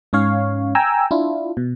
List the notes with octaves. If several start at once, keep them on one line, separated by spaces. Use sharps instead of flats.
G#2 C#4 C#5 F5
G5 G#5 A#5 E6
D4 E4 F4
B2